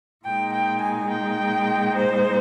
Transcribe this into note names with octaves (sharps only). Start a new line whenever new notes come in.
A#2 G#3 D#4 G5
G5
G#5
G5
C5